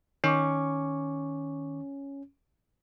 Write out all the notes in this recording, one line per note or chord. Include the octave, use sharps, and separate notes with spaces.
D#3 C#4 C#6 D6